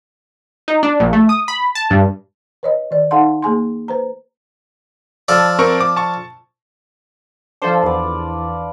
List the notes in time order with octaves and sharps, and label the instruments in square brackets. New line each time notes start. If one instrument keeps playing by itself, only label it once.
[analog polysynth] D#4
D4
A#1
A3
D#6
B5
A5
G2
[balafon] B4 C#5 D#5
D#3 D5
D#4 A4 F5 F#5 A5 C6
A#3 G#4 G#5 C6
B4 C5 A#5
[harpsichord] F3 A4 D5
[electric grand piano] C4 A#4 C#6
D6
A5 C#6
[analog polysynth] F3 A4 C5 [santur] D4 F4
[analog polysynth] E2 [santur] B4 D5